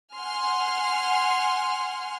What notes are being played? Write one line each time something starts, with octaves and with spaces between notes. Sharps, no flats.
F#5 G#5 C6 F6